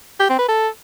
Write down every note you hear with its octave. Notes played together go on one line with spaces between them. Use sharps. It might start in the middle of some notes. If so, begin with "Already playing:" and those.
G4
C4
B4
A4